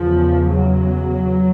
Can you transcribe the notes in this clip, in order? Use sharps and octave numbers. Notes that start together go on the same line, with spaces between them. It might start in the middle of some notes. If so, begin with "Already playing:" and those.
Already playing: E2 C#3 F3
F#3